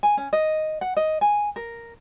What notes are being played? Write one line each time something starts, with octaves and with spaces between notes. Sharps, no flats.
G#5
C#4
D#5
F#5
D#5
G#5
A#4